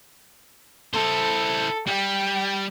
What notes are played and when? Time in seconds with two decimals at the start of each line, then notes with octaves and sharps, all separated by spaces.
0.94 E4 A4 C5
1.87 G3 G5